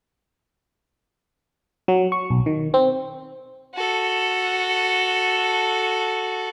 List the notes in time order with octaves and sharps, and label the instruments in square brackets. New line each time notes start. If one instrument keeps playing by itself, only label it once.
[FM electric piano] F#3
C#6
B1
D#3
C4
[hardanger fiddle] F#4 A4